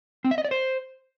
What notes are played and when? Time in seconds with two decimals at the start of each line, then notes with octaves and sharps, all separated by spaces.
0.24 C4
0.31 E5
0.38 D#5
0.44 D5
0.51 C5